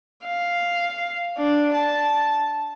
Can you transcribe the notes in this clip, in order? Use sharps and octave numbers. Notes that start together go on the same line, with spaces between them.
F5
D4
A5